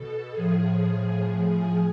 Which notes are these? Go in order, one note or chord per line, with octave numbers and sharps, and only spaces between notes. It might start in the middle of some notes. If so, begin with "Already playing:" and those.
Already playing: B2 A4
A2 F3 G#4
A2 F3
G#4